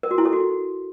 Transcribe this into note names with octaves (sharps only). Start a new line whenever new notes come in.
A#4
F#4
E4
A4
F#4